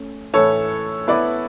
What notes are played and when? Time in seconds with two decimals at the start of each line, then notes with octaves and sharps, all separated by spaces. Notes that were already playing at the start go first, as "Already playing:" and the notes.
Already playing: A3 C#4
0.33 A2 E3 A3 E4 A4 B4 C#5
1.07 B3 E4 B4 D5